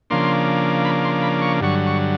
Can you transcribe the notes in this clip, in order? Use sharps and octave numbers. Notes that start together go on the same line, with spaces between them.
C#3 F3 A#3 D4 C6
B5
C6
B5
C#6
G2 D3 F#3 C#6
C#6